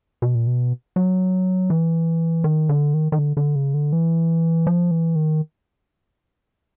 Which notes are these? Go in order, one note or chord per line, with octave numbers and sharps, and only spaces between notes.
B2
A#2
B2
F#3
E3
D#3
D3
D#3
D#3
D3
D3
C#3
D3
E3
F3
E3
D#3